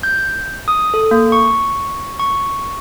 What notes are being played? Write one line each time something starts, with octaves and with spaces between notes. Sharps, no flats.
G6
D#6
A4
A#3
C#6
C#6